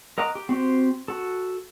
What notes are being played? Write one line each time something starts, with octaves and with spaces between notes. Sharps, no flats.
A#4 D#5 F#5 A#5 D6
G4
C4 F#4 G4 C5
F#4 A4